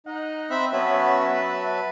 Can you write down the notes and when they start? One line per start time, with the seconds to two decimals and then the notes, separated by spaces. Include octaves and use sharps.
0.07 D#4 D#5 F#5
0.50 C4 E5 B5
0.73 F#3 B3 C#4 F#4 B4 E5 A5
1.33 B4